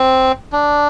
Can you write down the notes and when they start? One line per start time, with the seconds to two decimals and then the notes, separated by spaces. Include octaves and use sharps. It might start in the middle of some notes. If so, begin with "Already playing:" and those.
Already playing: C4
0.52 D4